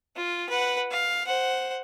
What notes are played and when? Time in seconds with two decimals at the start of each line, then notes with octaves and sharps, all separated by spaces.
0.16 F4
0.49 B4 F#5
0.91 F5
1.26 C5 F#5